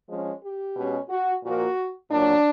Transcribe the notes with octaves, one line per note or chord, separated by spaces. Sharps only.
F3 G#3 C#4
G4
B2 G#3 C#4
F#4
A#2 F3 A#3 F#4
A#2 F#3 A#3 C#4 D4